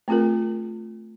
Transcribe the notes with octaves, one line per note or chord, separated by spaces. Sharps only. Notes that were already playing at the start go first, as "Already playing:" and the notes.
A3 C4 F4 G#4 A#4